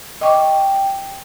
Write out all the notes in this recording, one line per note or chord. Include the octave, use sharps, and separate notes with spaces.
D#5 G5 C#6 D6